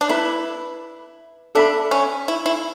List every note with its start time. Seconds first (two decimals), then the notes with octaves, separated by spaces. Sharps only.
0.01 D4
0.09 E4 B4 E5 B5
1.55 D4 A4 E5 B5
1.91 C#4
2.28 E4
2.46 E4